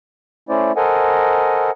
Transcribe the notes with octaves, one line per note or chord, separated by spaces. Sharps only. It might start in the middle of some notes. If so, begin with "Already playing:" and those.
A3 C#4 E4 C5 D5
A4 A#4 C5 D#5 F#5 G#5